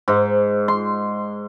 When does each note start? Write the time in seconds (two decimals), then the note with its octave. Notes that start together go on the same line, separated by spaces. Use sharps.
0.08 G#2
0.68 C6